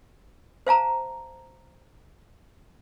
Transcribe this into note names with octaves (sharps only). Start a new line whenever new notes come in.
C5 F5 A5 A#5